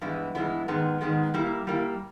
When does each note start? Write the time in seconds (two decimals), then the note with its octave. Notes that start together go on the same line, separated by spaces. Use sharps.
0.01 G2 E3 G#3 B3 E4
0.35 G2 E3 G#3 B3 E4
0.68 G#2 D#3 G#3 B3
1.01 G#2 D#3 G#3 B3
1.34 G3 A#3 E4
1.67 G3 A#3 E4